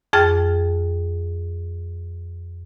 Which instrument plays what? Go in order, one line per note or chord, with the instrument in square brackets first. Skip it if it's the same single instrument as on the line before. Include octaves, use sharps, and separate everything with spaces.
[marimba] F2 G#4 G5 F6 A6